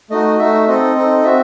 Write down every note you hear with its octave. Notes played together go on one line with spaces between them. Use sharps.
A3 D#4 F#4 D#5
A3 D#4 F#4 E5
C4 D#4 A4 D#5
C4 D#4 A4
C4 F#4 E5